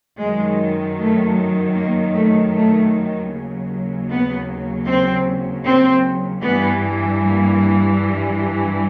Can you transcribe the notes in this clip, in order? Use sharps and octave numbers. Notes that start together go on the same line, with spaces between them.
F#2 D#3 F#3 G#3
A3
A#3
A3
A3
D#2 C#3 F#3
B3
C4
C4
G2 E3 G3 B3
A#3